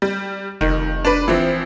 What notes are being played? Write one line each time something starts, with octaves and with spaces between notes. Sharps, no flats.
G3
F1 D#3
D4 B4
E3 F3 C4